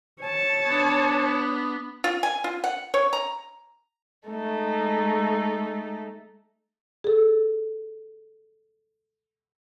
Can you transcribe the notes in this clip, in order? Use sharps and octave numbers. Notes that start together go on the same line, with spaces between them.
C#5 A5
B3 D4
F4
G#5
F4
F#5
C#5
A#5
G#3 A3 D#4 A4
G#4 A4